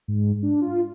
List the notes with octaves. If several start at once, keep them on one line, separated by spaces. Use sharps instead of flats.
G#2
D4
F4